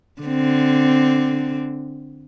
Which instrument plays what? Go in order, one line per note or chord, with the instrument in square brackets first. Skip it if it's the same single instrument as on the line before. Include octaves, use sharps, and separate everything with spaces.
[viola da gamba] D3 C4